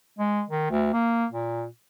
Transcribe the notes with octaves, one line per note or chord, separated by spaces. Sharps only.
G#3
D#3
D2
A#3
A#2